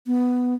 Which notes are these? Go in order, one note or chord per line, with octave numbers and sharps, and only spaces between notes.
B3